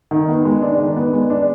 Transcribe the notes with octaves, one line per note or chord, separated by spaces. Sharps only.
D#3
B3
G#3
D4
D#3
B3
G#3
D4